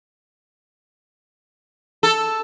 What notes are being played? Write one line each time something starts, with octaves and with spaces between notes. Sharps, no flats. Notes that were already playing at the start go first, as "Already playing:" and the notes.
A4